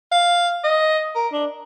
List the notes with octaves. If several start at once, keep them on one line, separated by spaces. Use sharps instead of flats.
F5
D#5
A#4
D4